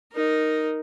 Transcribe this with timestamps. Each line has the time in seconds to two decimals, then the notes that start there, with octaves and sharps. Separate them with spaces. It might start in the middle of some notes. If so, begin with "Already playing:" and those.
0.12 D#4 A#4